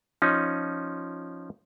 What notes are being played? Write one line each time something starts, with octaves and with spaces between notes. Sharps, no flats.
F3 C#4 D#4